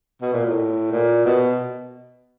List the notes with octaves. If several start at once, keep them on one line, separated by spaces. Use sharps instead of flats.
B2
A#2
A2
A#2
B2